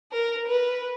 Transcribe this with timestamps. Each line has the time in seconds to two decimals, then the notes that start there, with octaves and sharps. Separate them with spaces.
0.12 A#4
0.47 B4